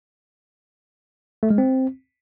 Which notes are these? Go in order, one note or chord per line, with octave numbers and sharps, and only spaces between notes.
A3
G#3
C4